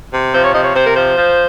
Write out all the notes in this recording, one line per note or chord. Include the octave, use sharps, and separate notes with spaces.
C3
F3 C5
C#5
C3 D#5
C#5
C3 C5
A#4
F3 C5
F3